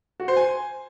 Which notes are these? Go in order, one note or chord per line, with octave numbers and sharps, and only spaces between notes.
F#4
C5
G#5